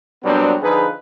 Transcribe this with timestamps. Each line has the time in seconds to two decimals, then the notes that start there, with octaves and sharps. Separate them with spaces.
0.24 A#2 F#3 G3 B3 C4 D4
0.62 D3 F3 D#4 G#4 B4